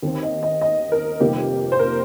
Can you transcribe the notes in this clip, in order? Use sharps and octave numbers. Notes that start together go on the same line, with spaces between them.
D#2 D#3 C4
D#5
D#5
D#5
A#4
F1 F2 D#3 G3 A#3 G4
C5
A#4